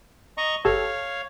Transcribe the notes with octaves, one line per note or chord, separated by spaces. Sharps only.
D#5 A#5 C#6
G1 G4 A4 C#5 F5